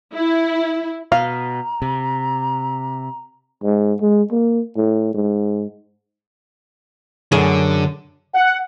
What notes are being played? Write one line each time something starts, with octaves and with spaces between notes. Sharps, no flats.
E4
B2 F5 A#5
C3
G#2
G#3
A#3
A2
G#2
F#2 D3 G#4
F#5